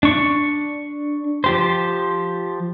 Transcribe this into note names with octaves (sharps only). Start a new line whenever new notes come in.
D4 C#6
F3 G4 C5